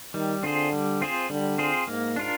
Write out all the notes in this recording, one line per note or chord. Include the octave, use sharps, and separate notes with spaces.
D#3 G3
D3 C4 F4 G#4 C5
G3
C4 F4 G#4 C5
D3 G3
C4 F4 G#4 C5
G#2 A#3
D4 F4 A#4